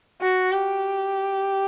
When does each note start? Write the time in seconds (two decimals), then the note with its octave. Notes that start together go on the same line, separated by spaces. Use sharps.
0.21 F#4
0.51 G4